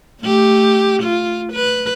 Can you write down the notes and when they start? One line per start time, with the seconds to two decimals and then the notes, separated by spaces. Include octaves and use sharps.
0.21 A3 G4
1.03 F4
1.53 B4